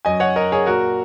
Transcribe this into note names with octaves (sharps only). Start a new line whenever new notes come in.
F#2 F#3 D#5 G#5
C#5 F#5
A#4 D#5
G#4 C#5
A#2 F#3 F#4 A#4